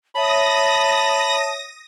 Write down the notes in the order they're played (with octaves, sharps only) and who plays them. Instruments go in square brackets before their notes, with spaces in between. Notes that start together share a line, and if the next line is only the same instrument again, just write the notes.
[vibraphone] C#5 E5 [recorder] A5 [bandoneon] B5 [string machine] D#6 A#6